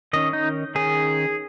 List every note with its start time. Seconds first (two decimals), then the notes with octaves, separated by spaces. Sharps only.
0.13 D#3 C#4 D#5
0.33 D#4
0.75 D#3 C#4 G#4